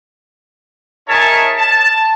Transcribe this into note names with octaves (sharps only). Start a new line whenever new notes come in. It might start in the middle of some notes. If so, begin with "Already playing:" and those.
D#4 G#4 A#4 C#5 E5 A5
A5